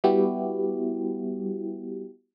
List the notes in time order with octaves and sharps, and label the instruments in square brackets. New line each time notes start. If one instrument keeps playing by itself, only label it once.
[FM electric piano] G3 B3 E4 F#4 G4